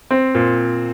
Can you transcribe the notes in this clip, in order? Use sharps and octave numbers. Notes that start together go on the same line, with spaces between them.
C4
A#2